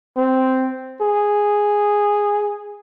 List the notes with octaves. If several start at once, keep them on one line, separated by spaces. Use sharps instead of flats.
C4
G#4